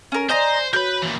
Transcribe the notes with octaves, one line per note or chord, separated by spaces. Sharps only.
C#4 A#4
C5 D5 D#5 G#5 A#5
F#4 A#4 B4 C#5 G6
A#2 E3